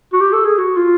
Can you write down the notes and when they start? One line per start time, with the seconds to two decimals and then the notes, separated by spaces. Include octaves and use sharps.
0.13 F#4
0.20 G4
0.33 A4
0.45 G#4
0.58 F#4
0.77 F4